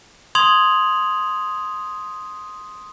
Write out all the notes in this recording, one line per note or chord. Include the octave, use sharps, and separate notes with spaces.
C6 D#6 G#6 F7 F#7